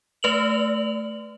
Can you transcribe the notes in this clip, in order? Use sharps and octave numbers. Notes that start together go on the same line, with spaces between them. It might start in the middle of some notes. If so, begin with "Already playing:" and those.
A3 B4 F7 F#7